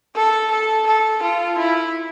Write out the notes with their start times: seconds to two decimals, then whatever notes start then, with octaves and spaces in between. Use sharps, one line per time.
0.15 A4
0.51 A4
0.87 A4
1.22 F4
1.58 E4